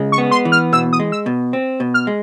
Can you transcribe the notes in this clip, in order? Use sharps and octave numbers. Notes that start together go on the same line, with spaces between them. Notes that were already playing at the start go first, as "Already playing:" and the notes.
Already playing: C#3 G#3
C#6
B3
C6
E3
F6
B2 E6
D#6
G#3
E6
B2
C4
B2
F6
G#3